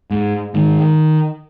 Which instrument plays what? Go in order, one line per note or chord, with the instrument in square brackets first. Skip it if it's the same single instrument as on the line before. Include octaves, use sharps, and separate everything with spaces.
[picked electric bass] G#2
G#2 D#3